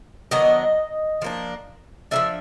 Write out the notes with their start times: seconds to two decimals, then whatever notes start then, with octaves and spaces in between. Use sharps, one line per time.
0.31 D#3 F#3 B3 D4 D#5
1.22 F3 A#3 D4
2.11 F3 A#3 D4 E5